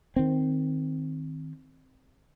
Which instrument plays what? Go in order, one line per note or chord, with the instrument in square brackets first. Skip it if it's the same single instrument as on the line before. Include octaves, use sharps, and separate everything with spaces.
[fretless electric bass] D#3 C4